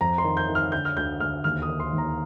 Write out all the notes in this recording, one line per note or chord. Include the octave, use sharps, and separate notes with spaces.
F2 A#5
C6
D#3
G6
D#3
F6
D3 G6
F6
D2 G6
D2 F6
D#2 F6
D#6
D#3
C6
D#2
A#5